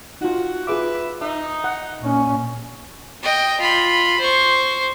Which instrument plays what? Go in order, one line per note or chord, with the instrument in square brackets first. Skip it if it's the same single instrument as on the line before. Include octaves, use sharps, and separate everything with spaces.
[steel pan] D#4 F4 [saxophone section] F#4
[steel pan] F4 G#4 D6 [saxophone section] B4 E5
[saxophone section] D#4 [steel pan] E5
[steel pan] F#5
[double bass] A#2 C#4
[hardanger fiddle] D#5 G5
F4 B5
C5 C#6